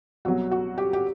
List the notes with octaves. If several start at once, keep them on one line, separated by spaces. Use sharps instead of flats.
C2 B2 F#3 F#4
F#4
G4
G4